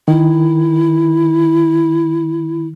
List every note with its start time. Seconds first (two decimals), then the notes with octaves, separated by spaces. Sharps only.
0.08 D#3 E4